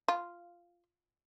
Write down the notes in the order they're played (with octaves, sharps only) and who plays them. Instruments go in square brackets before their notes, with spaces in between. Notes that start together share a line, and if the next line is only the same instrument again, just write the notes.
[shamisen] F4